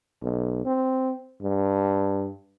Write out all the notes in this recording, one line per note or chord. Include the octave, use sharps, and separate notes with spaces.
B1
C4
G2